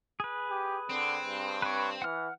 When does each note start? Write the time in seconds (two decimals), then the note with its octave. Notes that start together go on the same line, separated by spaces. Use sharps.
0.20 G#4 B4
0.50 G4
0.90 D3 C4
1.24 G2
1.62 B4 C#5
2.02 E3 F#5 F6